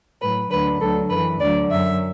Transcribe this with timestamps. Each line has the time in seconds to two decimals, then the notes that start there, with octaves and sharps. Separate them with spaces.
0.21 A2 F#3 B4
0.50 D2 D3 F#3 B4
0.81 D2 D3 F#3 A4
1.10 F#2 E3 B4
1.40 D2 D3 F#3 D5
1.70 F#2 F#3 E5